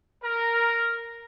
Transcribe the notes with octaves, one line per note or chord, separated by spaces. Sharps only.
A#4